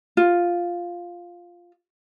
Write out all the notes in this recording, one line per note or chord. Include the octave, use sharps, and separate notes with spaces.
F4